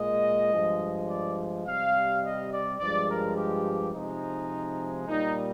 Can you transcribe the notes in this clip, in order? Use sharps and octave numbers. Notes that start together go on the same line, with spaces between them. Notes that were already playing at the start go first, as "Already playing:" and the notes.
Already playing: A#2 G#3 D#5
G2 F3 G#3
D5
C3 G3 F5
D#5
D5
G2 F3 G#3 D5
A#4
G4
C3 F3 G#3 D#4
A#2 G3 D#4